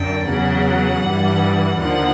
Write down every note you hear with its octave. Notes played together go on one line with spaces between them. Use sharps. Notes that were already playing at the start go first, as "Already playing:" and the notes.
Already playing: F#2 D3 G5
E2 C#3 F#3 F#5
G2 E3 G3
D#2 D3 F3 F#5